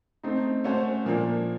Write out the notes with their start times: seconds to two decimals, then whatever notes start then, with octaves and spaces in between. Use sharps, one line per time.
0.23 A3 C4 D#4
0.64 A3 C#4 F#4 A4 C5
1.05 A#2 F3 A#3 D4